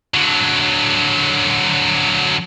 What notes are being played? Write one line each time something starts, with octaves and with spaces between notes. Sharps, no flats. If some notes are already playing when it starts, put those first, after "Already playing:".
D3 F#3